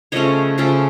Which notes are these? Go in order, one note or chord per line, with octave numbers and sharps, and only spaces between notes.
C#3 F3 A3 C#4 C#5 D#5
C#3 F3 A3 C#4